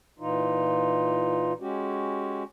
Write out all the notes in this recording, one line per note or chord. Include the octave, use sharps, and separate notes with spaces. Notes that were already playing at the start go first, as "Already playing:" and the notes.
A#2 E3 D#4 F4
G#3 C#4 F#4 G4